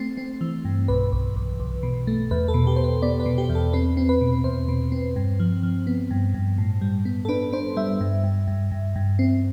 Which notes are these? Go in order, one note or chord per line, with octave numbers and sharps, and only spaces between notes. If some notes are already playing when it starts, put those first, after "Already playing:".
Already playing: A3 C4 C5
C4
E3
G2
B1 B4
B1
B1
B1
B2
A3
E2 B4
A4
B2
G4
B2 C5
B4
B3 D5
B4
B2
G4
E2
A4
C4 B4
C4
B4
B2
E2 C5
B2
C4
G2
F3
F3
B3
G2
G2
A2
G3
B3
A4
D4 B4
D4 C5
G3 E5
G2
G2
G2
G2
G2
C4